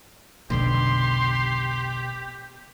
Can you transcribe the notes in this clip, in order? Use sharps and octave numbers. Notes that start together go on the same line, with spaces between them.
F1 B1 B2 D3 G4 C6